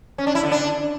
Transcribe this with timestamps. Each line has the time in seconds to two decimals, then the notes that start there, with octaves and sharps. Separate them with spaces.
0.18 C#4
0.27 D4
0.35 E4
0.43 D3
0.52 D4